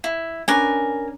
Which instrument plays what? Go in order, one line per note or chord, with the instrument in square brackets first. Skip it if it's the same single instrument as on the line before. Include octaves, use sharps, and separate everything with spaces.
[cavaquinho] E4
[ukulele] C#4 D4 B4 [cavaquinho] A#4 G#5